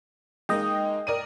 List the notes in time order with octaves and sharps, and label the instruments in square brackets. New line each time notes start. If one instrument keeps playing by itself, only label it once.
[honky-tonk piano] G#3 A#3 D#4 [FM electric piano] D#5 G5
[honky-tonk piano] A#4 D5 D#7